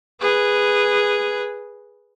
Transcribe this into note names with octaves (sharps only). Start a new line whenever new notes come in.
G#4 B4